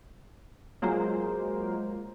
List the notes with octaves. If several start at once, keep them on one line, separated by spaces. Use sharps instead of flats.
F#3 G#3 A#3 F4 A#4 C5